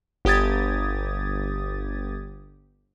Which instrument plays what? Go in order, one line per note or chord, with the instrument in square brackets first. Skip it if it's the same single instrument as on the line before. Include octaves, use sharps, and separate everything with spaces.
[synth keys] G1 G4 D#6 G#6 A6